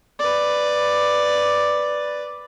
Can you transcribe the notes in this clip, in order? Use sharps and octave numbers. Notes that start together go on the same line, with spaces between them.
B4 D5